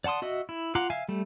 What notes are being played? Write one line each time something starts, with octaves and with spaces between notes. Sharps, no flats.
D5 F#5 A5 C6 D#6
F#4 D#5 E5
E4
F4 F5 F#5 A#5 D6
E5 F5 G#5
G3 A3